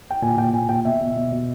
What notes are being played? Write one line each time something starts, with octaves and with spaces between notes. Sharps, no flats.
G5
A#2 G#5
A#2 G5
A#2 G#5
A#2 G5
B2 E5
B2
B2
B2